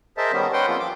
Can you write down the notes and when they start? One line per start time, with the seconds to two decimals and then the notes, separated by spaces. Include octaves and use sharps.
0.17 G#4 A#4 C5 D#5 E5 A5
0.32 D#3 G3 B3 C#4
0.53 C#4 B4 F#5 G5 C6
0.68 F3 A#3 C4 F4
0.80 D6